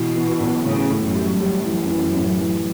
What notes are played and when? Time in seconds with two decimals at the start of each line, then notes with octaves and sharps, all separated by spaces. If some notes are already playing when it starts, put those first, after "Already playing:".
Already playing: B2 E3
0.16 E3
0.40 B1
0.65 A2 C#3
0.90 A2
1.03 F#2
1.16 G3
1.41 F#2 G3
1.65 E3
1.90 E3
2.16 A2
2.41 E3